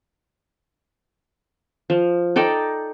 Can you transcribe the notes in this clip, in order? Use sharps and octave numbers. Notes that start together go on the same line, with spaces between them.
F3
D#4 A4 D5 G5